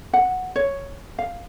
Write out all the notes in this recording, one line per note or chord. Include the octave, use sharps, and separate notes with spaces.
F#5
C#5
F5